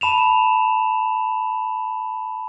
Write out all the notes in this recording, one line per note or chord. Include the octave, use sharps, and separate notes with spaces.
A5 B5 E7 F7